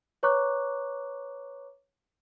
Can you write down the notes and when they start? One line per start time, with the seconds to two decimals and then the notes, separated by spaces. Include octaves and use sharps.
0.23 B4 C#5 A#5 C#6 D6 F#6